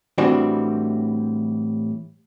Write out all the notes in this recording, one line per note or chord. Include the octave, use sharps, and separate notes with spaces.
A2 E3 G3 C4 D4 F#4